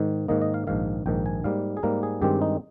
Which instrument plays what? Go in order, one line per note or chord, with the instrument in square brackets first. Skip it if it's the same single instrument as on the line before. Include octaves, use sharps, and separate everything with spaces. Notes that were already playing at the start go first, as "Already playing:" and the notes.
Already playing: [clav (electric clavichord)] G#2 D#3
G#2 D#3 A#3 D#5
D#5
F5
A#1 G#2 D#3 F5
A#1 G#2 D#3 G5
G#5
G#2 G3 A#3 F5
G#4
G#2 G3 A#3 A#4
G#4
G2 D#3 G#3 C4 G4
D#4